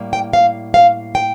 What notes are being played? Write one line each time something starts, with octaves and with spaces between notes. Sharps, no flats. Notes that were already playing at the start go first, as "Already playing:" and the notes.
Already playing: A2 G3 A#3
G5
F5
F5
G5